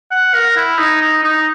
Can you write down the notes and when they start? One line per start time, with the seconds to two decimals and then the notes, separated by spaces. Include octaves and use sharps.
0.11 F#5
0.34 A#4
0.56 E4
0.78 D#4
1.01 D#4
1.23 D#4